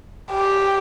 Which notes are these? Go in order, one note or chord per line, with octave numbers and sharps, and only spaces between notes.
G4